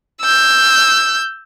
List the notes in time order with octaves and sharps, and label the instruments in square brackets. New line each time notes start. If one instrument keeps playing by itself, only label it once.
[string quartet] E6 G6